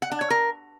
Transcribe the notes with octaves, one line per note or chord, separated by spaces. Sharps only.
F#5
D4
C#5
A#4